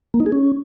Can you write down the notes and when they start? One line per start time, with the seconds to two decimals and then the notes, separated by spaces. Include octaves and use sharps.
0.14 A#3
0.20 D#4
0.26 G#4
0.32 C#4